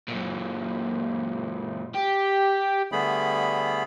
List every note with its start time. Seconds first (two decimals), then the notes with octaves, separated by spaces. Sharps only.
0.08 F#2 A#2
1.95 G4
2.92 D3 G3 A3 B3 G#4 B5